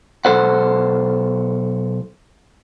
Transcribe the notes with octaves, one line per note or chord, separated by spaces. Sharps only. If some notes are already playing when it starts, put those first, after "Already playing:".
B1 A4 C5 F#5